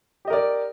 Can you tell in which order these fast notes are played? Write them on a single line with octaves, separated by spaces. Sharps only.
G4 D#5 A#4 D5